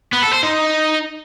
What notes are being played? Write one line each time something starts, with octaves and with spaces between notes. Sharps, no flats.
B3
A4
C5
D#4